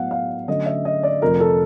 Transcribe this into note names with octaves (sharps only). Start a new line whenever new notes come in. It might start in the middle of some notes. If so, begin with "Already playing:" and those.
Already playing: A2 F#3 B3 F5 F#5
F5
D3 F#3 A3 C#4 D#5
E5
D#5
D5
F2 C3 F3 A3 A#4
A4